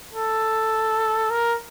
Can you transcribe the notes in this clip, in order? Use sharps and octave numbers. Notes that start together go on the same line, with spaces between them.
A4
A#4